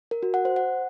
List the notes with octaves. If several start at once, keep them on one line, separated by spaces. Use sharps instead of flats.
A#4
F#4
F#5
C5
F#5